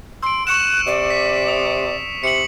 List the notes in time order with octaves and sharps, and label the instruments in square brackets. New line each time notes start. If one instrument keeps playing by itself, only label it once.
[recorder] C6 [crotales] E6 D7
[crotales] C#6 C#7 E7 [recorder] F#6
[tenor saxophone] C3 [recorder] D5
[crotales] B6
D#6
[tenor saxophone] C3 [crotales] C#7 F#7